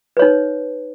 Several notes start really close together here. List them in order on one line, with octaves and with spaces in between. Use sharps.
B4 C#5 D#4